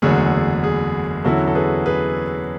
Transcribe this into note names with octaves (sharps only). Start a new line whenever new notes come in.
F#1 E2 D3 F#3 A3 G#4
G#4
E2 D3 F#3 C#4 E4 F#4 A4
A4
G#4 B4
G#4 B4